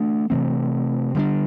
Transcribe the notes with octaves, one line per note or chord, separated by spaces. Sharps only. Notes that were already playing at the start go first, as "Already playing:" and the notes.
Already playing: E3 A3 D4
C3 E3 A3 C4
D3 G3 D4